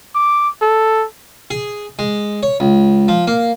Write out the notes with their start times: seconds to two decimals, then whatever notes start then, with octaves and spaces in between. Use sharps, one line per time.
0.15 D6
0.61 A4
1.50 G#4
1.99 G#3
2.43 C#5
2.60 C#2
3.08 F3
3.27 A#3